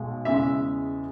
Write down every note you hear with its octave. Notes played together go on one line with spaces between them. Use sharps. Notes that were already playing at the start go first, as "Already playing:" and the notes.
Already playing: B1 B2 G#3
E2 C#3 G#3 E5